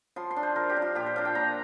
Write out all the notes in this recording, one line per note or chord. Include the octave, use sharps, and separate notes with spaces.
F3 C6
C6
D4
C5
F3 A#4
G4
D4
F4
A#2 G4
C5
F3 D4 F5
G5
A#2 A#5